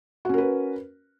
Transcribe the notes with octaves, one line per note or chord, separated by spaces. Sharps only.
C#4 F#4 A#4 B4